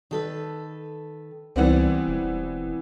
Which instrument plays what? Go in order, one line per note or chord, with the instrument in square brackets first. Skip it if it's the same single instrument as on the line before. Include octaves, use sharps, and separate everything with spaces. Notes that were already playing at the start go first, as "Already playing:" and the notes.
[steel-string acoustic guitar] D#3 A4 B4
[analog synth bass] C#2 [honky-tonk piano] E3 B3 C4 [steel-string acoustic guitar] G3 D5 F#5
[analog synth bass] E1